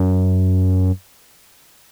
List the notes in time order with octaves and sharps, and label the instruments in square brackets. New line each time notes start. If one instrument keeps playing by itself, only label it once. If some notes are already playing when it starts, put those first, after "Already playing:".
Already playing: [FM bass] F#2